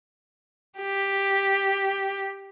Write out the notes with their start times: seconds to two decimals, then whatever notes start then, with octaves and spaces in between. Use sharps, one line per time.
0.79 G4